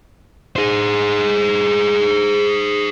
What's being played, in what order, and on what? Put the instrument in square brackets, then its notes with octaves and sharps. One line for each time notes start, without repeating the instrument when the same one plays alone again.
[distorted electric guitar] G#4 C5